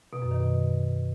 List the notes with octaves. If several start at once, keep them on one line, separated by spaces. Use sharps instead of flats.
B2
F#2
D#3
B2